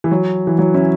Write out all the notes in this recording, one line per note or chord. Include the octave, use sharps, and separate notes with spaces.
E3
F#3
E3
F#3
C#4 E4